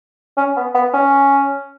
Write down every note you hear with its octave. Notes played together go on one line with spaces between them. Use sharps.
C#4
B3
B3
C#4